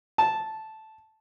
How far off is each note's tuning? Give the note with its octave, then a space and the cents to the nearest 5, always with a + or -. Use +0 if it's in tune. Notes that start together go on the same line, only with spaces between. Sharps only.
A5 -5